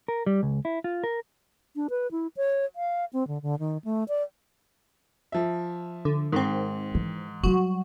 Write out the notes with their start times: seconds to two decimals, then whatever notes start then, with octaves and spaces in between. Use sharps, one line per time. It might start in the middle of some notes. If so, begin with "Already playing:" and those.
0.08 A#4
0.27 G3
0.43 C#2
0.65 E4
0.84 F4
1.04 A#4
1.76 D4
1.90 B4
2.11 E4
2.37 C#5
2.76 F5
3.13 C4
3.28 D3
3.42 D3
3.59 D#3
3.85 A3
4.08 D5
5.32 F3 E5
6.05 D3
6.32 G#2 D#3 C4
6.95 E3
7.44 F#3 G3 F#4